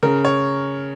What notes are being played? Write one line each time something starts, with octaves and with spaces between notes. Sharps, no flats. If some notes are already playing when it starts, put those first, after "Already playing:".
C#3 A#4
C#5